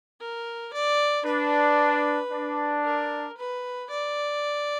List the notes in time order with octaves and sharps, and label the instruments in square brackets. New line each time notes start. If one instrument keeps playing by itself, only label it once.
[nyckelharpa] A#4
D5
[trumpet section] D4 [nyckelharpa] B4
[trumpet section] D4
[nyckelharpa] A#4
B4
D5